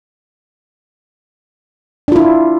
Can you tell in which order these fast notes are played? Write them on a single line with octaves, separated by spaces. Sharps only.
D4 F4 E4